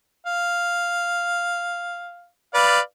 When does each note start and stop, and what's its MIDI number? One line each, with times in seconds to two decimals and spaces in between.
0.26 2.28 77
2.54 2.80 71
2.54 2.80 74
2.54 2.80 77